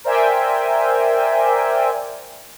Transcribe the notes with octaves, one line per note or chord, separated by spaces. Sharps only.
A#4 C5 D5 E5 G5 G#5